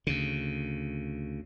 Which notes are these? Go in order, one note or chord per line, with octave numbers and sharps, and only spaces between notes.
D2 C#3